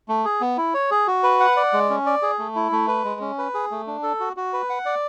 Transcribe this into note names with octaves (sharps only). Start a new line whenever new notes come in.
A3
G#4
B3
E4
C#5
G#4
F#4
B4
F#5
D5
G#3
C#4
D5
G#4
A3
E4
A3
B4
G#3
C#4
B4
G#4
A3
D4
A4
F#4
F#4
B4
F#5
D5